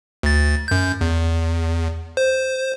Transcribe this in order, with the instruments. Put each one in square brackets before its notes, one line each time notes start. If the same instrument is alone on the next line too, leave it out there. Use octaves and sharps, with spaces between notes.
[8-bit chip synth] D2 A6
F#2 G6
E2
C5